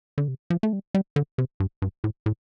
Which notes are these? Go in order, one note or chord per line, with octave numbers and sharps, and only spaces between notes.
D3
C3
F3
A3
G3
G3
D3
C3
G2
G2
A2
A2